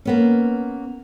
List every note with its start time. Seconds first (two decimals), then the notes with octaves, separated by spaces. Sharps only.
0.05 A#3 B3 C#4